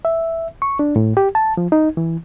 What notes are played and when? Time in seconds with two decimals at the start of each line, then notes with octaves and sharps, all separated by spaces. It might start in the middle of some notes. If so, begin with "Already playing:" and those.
0.05 E5
0.62 C#6
0.79 D4
0.96 A2
1.17 G4
1.35 A5
1.57 F3
1.72 D#4
1.97 E3